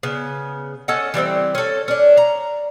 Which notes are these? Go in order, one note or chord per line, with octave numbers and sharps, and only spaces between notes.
C#3 B3
C#4 A4 D#5 F#5
E3 G3 B3 C4
C#4 A4
C#4 D4
A#5